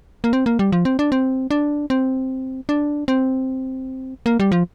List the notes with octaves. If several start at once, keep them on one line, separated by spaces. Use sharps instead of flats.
A#3
C4
A#3
G3
F3
C4
D4
C4
D4
C4
D4
C4
A#3
G3
F3